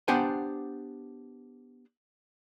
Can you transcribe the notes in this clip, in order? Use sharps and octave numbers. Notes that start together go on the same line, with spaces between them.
B3 D4 G4 C5 F#5 G#5